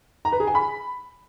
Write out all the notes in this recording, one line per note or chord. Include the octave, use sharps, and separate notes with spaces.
A#5
B4
G#4
G#5
B5